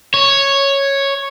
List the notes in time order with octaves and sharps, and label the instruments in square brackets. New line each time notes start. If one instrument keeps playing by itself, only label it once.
[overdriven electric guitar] C#5